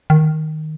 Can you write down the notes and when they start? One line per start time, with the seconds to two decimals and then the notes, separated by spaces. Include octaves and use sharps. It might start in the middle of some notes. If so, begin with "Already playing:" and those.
0.10 D#3